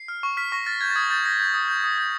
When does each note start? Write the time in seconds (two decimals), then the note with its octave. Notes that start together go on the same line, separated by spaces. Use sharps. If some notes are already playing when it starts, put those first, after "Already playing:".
Already playing: C7
0.08 F6
0.23 C#6
0.37 F6 B6
0.52 C#6 A#6
0.66 F6 A6
0.81 G6 G#6
0.90 A6
0.96 D#6 G#6
1.10 G6 A6
1.25 G6 A#6
1.40 G6
1.54 D#6
1.68 G6
1.84 D#6
1.98 G6